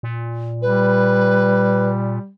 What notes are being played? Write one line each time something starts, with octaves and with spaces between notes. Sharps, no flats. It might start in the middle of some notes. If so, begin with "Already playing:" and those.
A#2
G3 B4